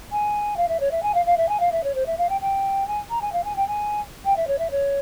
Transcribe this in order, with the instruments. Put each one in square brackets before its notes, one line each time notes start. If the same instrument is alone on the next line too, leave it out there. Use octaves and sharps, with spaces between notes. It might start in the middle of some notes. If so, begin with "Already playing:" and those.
[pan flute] G#5
F5
E5
C#5
E5
G#5
F5
F5
E5
G#5
F5
E5
C#5
C5
E5
F5
G5
G5
G#5
A#5
G#5
F5
G#5
G5
G#5
G5
E5
C#5
E5
C#5